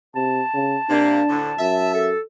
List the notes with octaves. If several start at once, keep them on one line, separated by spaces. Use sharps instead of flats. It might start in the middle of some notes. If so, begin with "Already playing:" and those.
C3 A5
C#3
C3 A#3 D4
D2 A2 D3
F#2 E5
A4